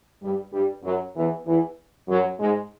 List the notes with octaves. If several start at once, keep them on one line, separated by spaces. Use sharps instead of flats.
G2 G3
G2 G3
F#2 F#3
E2 E3
E2 E3
F#2 F#3
G#2 G#3